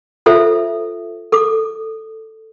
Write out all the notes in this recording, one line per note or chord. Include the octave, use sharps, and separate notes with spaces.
F4 A4 C5 E5
A4 D6